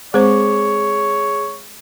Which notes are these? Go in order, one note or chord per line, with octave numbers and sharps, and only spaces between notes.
G#3 C4 G#4 C5 C#5